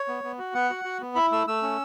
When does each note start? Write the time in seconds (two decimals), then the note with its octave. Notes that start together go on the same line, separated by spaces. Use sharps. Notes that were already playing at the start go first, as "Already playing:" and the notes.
Already playing: C#5
0.08 B3
0.24 B3
0.39 F#4
0.54 B3 F#5
0.70 F#4
0.85 F#4
1.01 B3
1.15 E4 B5
1.32 A3 E6
1.47 A3 E6
1.63 C#4